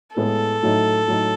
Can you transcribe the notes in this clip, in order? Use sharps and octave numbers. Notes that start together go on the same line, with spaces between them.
A2 G#3 B3 A4
A2 F#3 A3 D#4
A2 F#3 A3 D#4